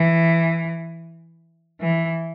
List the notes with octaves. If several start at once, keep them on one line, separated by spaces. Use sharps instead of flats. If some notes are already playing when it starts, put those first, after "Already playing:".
Already playing: E3
E3